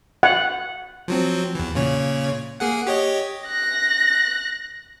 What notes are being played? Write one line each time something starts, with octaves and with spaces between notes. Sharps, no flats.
F#5
F3 F#3 C4
E2 E3
A#2 C#3 C#5
A#3 G#4 F#5
G4 C#5 D#5
F#6 A#6